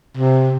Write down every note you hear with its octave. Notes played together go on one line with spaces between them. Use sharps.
C3